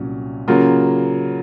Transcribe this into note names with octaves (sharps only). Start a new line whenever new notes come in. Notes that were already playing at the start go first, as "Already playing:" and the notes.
Already playing: C2 A#2 F#3 C#4
C#3 F#3 A#3 F4